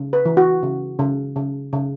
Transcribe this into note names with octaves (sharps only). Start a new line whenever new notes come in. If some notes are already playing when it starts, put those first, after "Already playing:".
Already playing: C#3
B4
E3
F#4
C#3
C#3
C#3
C#3